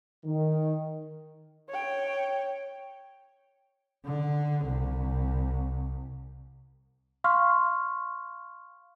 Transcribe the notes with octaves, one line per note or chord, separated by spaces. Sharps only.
D#3
C#5 G5
D3
C2
F5 C6 C#6 F6